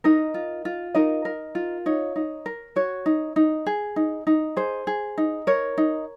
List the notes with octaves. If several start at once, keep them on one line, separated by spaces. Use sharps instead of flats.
D#4 A#4 D#5
F4
F4
D#4 A#4 D#5
A#4
F4
D#4 C#5
D#4
A#4
F#4 C#5
D#4
D#4
G#4
D#4
D#4
G#4 C5
G#4
D#4
A#4 C#5
D#4